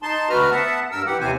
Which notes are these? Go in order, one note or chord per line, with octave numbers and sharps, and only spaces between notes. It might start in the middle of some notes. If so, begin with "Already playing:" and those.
D#4 A5 C6
D2 F#4 B4 A#5 F6
B3 E5 F#5 A5
G2 A#4 E6
E3 G4 F#5
D#2 C3 E3 C4 C5 G#5